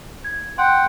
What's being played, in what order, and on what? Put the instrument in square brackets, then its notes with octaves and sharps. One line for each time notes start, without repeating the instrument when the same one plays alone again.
[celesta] G#6
[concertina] F#5 G5 [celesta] C6